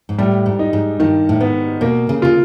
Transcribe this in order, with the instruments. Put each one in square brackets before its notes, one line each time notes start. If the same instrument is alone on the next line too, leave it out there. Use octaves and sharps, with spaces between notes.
[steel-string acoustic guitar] G#2
[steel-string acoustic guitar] A2 [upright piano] G3
[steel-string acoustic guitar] G#2
[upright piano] D#4
[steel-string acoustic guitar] G#2
[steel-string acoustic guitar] G2 [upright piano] D#3
[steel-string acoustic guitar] A2
[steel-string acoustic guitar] G#2 [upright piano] B3
[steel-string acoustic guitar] B2 [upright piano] A#3
[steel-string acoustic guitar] C#3
[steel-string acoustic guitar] C#3 [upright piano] F4